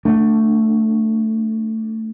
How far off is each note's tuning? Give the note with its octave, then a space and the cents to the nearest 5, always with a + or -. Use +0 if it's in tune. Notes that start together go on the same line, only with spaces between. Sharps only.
A3 +10 D4 +0